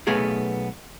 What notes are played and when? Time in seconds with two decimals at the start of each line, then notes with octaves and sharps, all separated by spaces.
0.07 B1 A3 B3 G#4 F5